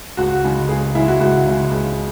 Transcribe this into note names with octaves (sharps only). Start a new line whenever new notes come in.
C#2 F#4
C#3 G#3
C#2 G#4
C#3 G#3 E4
F#4
C#2 F#4
C#3 G#3
C#2